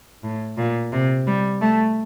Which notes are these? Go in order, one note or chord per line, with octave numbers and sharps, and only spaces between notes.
A2
A#2
C3
G3
A3